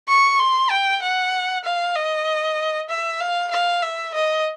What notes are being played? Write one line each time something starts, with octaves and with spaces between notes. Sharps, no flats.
C#6
C6
G5
F#5
F5
D#5
E5
F5
F5
E5
D#5